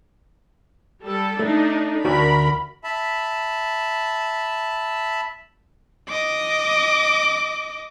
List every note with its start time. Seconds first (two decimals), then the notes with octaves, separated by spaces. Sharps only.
1.04 G3 A4
1.39 A3 D4 D#4
2.05 D2 F#4 A#4 D5 B5
2.84 E5 A5 B5
6.08 D#5 D6